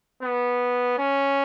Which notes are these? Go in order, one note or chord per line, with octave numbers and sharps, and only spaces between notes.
B3
C#4